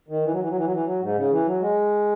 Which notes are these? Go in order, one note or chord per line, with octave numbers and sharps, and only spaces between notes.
D#3
E3
F#3
E3
F#3
E3
F#3
E3
F#3
G#2
C#3
E3
F#3
G#3